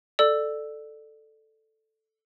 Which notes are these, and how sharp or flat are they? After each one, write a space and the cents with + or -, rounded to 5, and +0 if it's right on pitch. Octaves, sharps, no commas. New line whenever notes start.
A4 +0 D5 +20 E6 +0